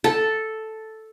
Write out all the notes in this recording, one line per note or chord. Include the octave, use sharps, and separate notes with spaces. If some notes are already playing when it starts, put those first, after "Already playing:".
A4